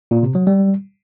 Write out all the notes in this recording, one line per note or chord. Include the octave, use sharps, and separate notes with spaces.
A#2
C3
F#3
G3